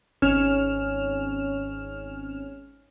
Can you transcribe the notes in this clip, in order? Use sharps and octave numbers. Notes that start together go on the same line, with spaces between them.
G#1 C#4 F6 E7